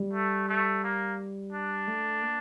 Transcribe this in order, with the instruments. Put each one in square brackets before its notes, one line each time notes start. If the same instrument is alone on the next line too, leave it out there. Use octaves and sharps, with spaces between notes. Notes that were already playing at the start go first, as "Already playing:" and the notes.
Already playing: [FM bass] G3
[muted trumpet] A3
A3
A#3
D4
[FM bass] A3
A#3